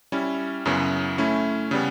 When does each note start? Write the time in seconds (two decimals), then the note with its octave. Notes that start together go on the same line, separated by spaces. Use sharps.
0.12 G3 C#4 E4
0.66 F#2 C#3 F#3 B3 E4
1.18 A3 C#4 E4
1.71 C#3 G3 B3